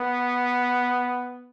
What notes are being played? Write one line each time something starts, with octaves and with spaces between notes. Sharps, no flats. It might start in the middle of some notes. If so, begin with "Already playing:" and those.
Already playing: B3